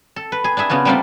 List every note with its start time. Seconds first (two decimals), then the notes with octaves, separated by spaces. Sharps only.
0.16 A4
0.32 B4
0.44 G#4
0.57 D4 E4 G#4 E5
0.69 C#3 B3 F4 F#4
0.85 G3 A3 A#3 C4 D4 F4